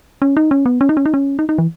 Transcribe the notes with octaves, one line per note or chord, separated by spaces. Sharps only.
C#4
D#4
C#4
B3
C#4
D#4
C#4
D#4
C#4
D#4
D#4
E3